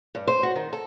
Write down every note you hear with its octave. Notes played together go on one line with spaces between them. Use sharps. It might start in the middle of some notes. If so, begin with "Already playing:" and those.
G2
C5
F#4
D#3
A4